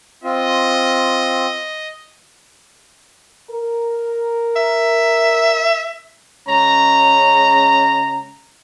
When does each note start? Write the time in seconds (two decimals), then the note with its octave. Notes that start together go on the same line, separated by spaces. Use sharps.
0.24 C4 F4 D#5
3.50 A#4
4.56 E5
6.48 C#3 G#3 C#4 A#5